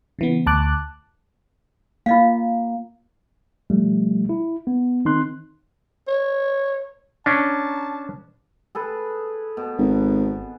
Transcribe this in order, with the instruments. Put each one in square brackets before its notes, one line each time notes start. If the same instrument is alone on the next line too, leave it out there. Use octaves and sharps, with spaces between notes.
[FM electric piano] C#3 E3 B3
D2 A5 D6 F#6
[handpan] A#3 [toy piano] F4 D#5 F5
[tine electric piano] B2 F3 G3 A3
E4
B3
D#3 C4 D#4 C6 F#6
[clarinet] C#5
[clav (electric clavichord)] C#4 D4 [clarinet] A5
[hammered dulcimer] G#4 A4 B4
B2
[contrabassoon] G#1